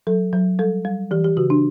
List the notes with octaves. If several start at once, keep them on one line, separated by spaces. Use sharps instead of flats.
F#3 A4
F#3
G3 A4
G3
E3 G4
G4
C#3 F#4
D4